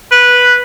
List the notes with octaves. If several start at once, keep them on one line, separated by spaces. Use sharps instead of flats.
B4